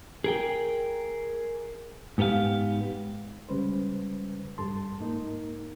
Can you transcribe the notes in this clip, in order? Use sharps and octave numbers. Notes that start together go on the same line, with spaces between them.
G#4 A#4 G5
G#2 B3 G4 G#4 F5
C#3 G3 G#3 C#4 B4 C5
G2 A4 A5 C6
G#2 A#3 D#4 A#4